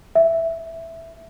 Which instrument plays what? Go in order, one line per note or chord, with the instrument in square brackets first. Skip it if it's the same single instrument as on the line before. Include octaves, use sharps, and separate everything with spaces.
[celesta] E5